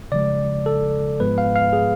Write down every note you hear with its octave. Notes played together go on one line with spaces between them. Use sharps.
C#3 F3 G#3 D5
A4
G#2 F3 G#3 B3 B4
F5
F5
G#4